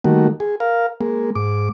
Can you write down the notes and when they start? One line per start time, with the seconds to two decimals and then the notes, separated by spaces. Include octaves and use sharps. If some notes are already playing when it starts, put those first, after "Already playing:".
0.04 D#3 G3 A3 A#3 F#4
0.40 G#4
0.60 A#4 F5
1.01 G#3 A#3
1.35 G#2 D6